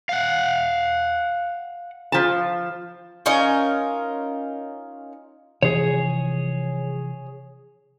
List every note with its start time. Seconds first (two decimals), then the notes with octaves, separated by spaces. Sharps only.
0.09 F5 F#5
2.12 F3 A5
3.26 C#4 D#4 F4 A#4
5.63 C3 E3 F3 G#4 C#5